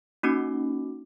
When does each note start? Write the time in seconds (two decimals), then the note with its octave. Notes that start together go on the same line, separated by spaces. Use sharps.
0.23 A#3 C#4 D#4 F#4 D6